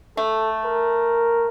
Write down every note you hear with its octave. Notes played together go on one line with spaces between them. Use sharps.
A3 A4
A#4